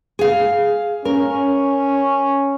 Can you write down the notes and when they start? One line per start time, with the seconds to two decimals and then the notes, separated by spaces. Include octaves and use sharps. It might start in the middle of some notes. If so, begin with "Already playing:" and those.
0.19 G#4 F5
1.05 C#4 A#4